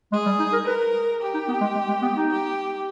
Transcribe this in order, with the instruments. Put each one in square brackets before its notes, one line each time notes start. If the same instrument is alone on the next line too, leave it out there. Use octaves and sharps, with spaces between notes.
[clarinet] G#3 [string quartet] G#4
[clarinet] G3
D#4
A#4
[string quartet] A#4 [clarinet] B4
[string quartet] G4
[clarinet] D#4
B3
G#3
G#3
G#3
B3
D#4
[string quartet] G4